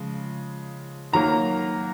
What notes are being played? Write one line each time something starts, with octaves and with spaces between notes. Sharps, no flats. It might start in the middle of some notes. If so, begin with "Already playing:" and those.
Already playing: C#3 F3 G#3
D#3 F#3 A#3 A#5